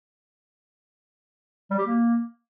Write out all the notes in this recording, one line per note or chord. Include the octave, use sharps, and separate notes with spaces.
G3
G4
A#3